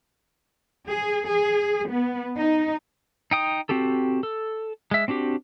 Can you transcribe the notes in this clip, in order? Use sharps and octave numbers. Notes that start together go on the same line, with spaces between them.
G#4
G#4
B3
D#4
D#4 G5 D#6
C4 F#4 G4 A4
A4
G#3 E5
C4 D4 F#4 G4